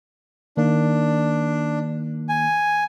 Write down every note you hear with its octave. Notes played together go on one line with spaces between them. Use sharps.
D#3 A#3 D4
G#5